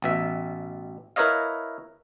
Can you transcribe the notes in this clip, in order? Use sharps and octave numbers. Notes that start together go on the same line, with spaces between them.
A1 B2 E5
E4 A#4 B4 C#5 D#5 F5